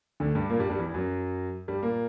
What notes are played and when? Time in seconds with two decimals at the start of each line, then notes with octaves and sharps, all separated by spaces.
0.20 D2 D3
0.35 G2 G3
0.50 A#2 A#3
0.59 G2 G3
0.70 G2 G3
0.79 E2 E3
0.94 F#2 F#3
1.68 G2 G3
1.83 A#2 A#3